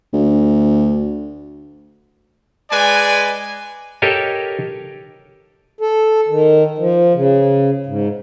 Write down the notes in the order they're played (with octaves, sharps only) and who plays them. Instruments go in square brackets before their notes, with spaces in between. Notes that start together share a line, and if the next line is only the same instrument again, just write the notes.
[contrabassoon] D2
[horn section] G#3 B4 D5 G#5
[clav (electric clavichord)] G4 A4 A#4 C#5 D#5 F5
[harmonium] A4
D#3
F3
C#3
G#2